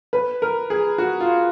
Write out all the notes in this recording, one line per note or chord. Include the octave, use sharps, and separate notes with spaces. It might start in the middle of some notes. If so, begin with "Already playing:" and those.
B4
A#4
G#4
F#4
F4